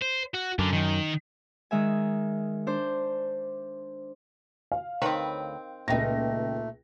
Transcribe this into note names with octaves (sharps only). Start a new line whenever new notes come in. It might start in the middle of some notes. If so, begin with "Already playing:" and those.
C5
F#4
F#2 D3
D#3
D#3 G#3 E5 G#5
D4 C5
F5
D2 D#3 C4 B4 C#5
C#2 A#2 A3 D#4 G5 A#6